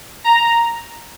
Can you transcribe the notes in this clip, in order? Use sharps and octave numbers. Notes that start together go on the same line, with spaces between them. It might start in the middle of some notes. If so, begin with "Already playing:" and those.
A#5